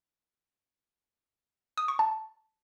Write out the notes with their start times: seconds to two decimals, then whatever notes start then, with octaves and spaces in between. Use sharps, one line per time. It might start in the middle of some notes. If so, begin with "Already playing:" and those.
1.77 D#6
1.88 C#6
1.99 A5